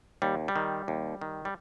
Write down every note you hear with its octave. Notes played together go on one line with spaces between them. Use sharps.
D#2 G3
G3
D#3
D#2
D#3
G3